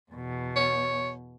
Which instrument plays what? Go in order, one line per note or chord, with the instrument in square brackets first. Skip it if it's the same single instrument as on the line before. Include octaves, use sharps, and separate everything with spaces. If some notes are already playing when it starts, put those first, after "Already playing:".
[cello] E2 B2
[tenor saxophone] C#5